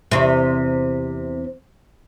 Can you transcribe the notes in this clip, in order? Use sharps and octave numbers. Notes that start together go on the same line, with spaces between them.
E2 C3